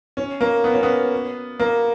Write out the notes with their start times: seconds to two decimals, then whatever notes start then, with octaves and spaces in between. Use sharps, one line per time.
0.17 C#4
0.41 A#3
0.64 B3
0.74 C#4
0.83 B3
1.60 A#3